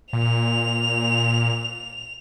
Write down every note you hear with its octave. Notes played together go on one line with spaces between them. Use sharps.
A#2 F7